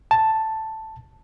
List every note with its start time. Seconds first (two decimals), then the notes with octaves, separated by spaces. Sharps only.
0.11 A5